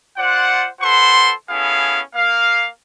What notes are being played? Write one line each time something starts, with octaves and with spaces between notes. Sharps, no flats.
F4 C5 D5 F#5
F4 A4 B4 C5 F#5 C6
B3 C#4 E4 G#4 A4 F5
A#3 F5